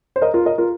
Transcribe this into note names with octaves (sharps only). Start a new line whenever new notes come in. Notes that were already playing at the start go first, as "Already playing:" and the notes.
C5
A#4 D#5
F4 A#4
A#4 D#5
F4 A#4